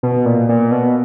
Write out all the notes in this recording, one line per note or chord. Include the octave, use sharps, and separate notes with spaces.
B2
A#2
A#2
B2